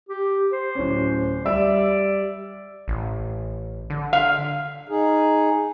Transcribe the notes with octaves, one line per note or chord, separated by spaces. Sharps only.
G4
C5
D1 C#4
G3 D5 E5 E6
A1
D3
F5
D#4 G#4